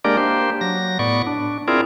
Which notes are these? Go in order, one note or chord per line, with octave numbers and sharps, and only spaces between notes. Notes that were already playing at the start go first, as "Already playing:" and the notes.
G#3 A#3 D4 G4 A#4 D5
A#3 D4 G4 C5
F#3 A#6
A2 B3 D5 C#6
D4
C4 E4 F4 G#4 A#4 D5